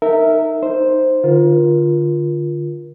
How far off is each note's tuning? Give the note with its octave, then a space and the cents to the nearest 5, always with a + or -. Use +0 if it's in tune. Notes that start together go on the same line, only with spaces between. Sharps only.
D#4 +0 A#4 -20 E5 -15
D#4 +0 C5 +0
D3 +5 F4 +0 A#4 +30